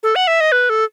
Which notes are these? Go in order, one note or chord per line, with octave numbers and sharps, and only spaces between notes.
A4
F#5
E5
D#5
B4
A4